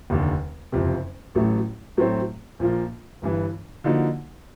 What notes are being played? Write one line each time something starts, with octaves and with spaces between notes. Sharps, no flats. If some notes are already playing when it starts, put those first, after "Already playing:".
F1 D#2 D3
F#1 F2 C3
A1 A2 F#3 A3
A2 F#3 A3 C4
A#1 A#2 F3 A#3
G1 G2 E3
D3 F3 A#3 D#4 F#4